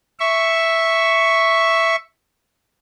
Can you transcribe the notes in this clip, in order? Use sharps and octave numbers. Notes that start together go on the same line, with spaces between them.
E5 C#6